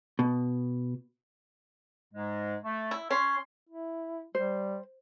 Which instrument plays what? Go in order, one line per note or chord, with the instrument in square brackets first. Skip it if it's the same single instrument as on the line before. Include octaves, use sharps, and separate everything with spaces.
[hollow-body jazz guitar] B2
[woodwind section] G#2 G#3
A3
[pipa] E4
[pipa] C#4 [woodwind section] C6
[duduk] E4
[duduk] G3 [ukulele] C5